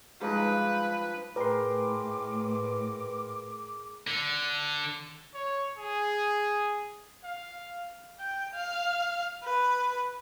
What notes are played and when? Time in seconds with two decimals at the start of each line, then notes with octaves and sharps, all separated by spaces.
0.21 G2 F3 G#3 D#4 B4
1.36 A2 G#4 A#4 B4 G5 C6 D6
4.07 D3
5.35 C#5
5.77 G#4
7.24 F5
8.20 G5
8.54 F5
9.44 B4